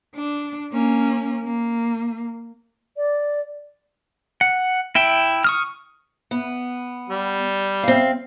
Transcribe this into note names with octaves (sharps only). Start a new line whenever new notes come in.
D4
A#3 C#4
A#3
D5
F#5
E4 E5 G5
C#6 D#6 F6
B3
G3
C4 F5